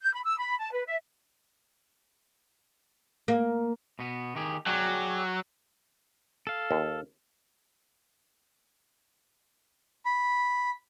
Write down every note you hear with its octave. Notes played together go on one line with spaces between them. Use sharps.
G6
B5
E6
B5
A5
B4
E5
A#3
B2 B3
D#3 G4 G#4
F#3 G#4 D5 G5
A4 F5
D#2
B5